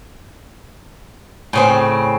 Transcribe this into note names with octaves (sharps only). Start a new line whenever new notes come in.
A2 C#3 C4